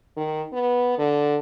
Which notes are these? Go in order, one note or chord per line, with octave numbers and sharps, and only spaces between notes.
D#3
B3
D3